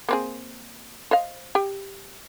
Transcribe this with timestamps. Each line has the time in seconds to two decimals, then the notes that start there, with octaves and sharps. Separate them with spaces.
0.09 A#3 C4 G#4
1.11 C5 D#5 F5
1.55 G4 G5